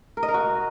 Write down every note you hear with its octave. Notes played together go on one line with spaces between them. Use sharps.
A#4
D#5
A#4
F#4